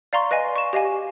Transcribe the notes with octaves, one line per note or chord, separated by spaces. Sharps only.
D5 F5 A#5 C6 C#6
B4 D#5 F5 G#5
C#6 E7
G4 D#5 F5 G#5